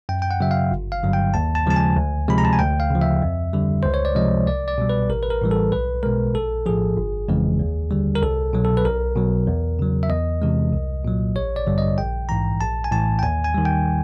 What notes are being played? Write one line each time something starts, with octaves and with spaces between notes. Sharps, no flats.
F#2 G5
G5
F#5
C#3 F#3 E5
F5
G1
F5
G2 D3 F#3
G5
D#2 A5
A5
C#3 F3 G#3 A5
G#5
D2
C3 F3 G#3 B5
A#5
A5
G#5
D2 G5
F5
C#3 F3
E5
F2
D3 G3
C#2 C5
C#5
D5
C3 F3 G#3 D#5
C2 D5
D5
B2 G3
B4
A1 A#4
B4
A#4
A2 E3 G3
A4
B1 B4
B2 G#3 A#4
A#1 A4
A2 F3 G#4
G1
F2 C#3 E3 G#3
D#2
D3 G3
A#4
C2 A4
B2 F#3
A4
B4
B1 A#4
B2 F#3
E2
C#3 F#3
E5
E2 D#5
C3 E3 G#3
C2
A#2 F#3
A1 C#5
D5
G2 D3 G3
D#5
A#1 G5
G#2 E3 A#5
A#1 A5
G#5
A2 E3 A5
G5
D#2 G#5
G#5
D#3 G3
G5